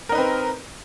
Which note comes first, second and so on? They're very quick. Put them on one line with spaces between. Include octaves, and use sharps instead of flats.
A#4 D#4 B4 C4